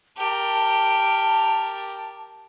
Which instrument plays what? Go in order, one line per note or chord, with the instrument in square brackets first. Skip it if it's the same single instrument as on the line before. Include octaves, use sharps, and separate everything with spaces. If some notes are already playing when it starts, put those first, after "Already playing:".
[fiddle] G4 A#4 [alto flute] A5